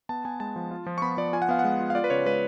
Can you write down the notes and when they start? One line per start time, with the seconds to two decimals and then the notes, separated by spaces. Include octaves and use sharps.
0.09 B3 A5
0.25 B3 G#5
0.40 G#3 A5
0.56 F3
0.71 F4
0.86 F3
0.98 C#6
1.02 B3 B5
1.17 F3 D5
1.33 F4 G#5
1.42 F#5
1.49 B3 F5
1.59 F#5
1.64 G#3
1.80 F4
1.90 F5
1.95 F4 D5
2.04 B4
2.10 C#3 C#5
2.26 G#3 B4